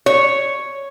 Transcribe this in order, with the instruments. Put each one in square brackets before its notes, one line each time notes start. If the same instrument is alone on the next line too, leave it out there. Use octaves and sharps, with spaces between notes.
[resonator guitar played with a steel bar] C#5